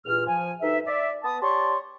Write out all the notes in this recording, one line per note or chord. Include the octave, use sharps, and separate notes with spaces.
E2 G2 A#2 F6
F3 G#5
D2 G2 D#4 E5
D5 E5
B3 A5 D#6
G4 C#5 D5 A5 C6 C#6